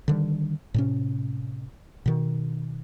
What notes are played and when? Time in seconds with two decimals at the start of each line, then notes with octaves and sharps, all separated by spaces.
0.08 D3 D#3 G3
0.74 A2 C3 C#4
2.06 B2 D#3